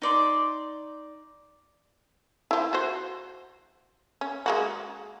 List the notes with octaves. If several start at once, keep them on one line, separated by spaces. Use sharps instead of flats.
D#4 D5 C6
F3 E4
F#4 C5
C#4
G#3 A#3 F#4